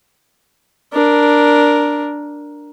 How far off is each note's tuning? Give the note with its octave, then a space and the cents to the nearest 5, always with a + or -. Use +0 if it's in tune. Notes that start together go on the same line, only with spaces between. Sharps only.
D4 +0 A#4 +5